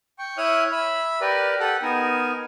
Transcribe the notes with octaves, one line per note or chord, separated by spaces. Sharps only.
G5 C#6
E4 C#5 E5 D#6 F6 F#6
E5 B5
G4 A#4 B4 D5
G4 A4 F#5
B3 D#4 A#4 G#5